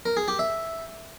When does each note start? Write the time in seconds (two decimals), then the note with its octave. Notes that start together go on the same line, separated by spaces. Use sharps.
0.06 A#4
0.17 G#4
0.28 G4
0.39 E5